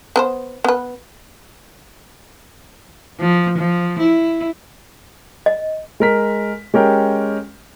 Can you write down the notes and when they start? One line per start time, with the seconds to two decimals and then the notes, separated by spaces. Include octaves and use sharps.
0.16 B3 B4 C5
0.64 B3 B4
3.20 F3
3.58 F3
3.99 E4
5.46 D#5
6.00 G#3 A#4 B6
6.74 G#3 C#4 G4 A#4 G5